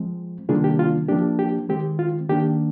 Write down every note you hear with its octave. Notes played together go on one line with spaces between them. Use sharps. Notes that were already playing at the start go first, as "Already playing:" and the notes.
Already playing: F3 G#3 C4
C3 D#3 G3 A#3 D4 F4 G#4
G4
F4
F3 A#3 D4 G4
G4
D#3 G#3 C4 G4
F4
D#3 A#3 D4 G4